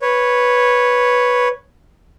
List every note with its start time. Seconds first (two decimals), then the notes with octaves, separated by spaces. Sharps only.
0.02 B4 C#5